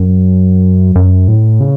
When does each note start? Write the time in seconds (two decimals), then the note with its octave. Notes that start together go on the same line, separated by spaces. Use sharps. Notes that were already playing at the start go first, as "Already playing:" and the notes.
Already playing: F#2
0.96 F#2
1.28 A2
1.60 C#3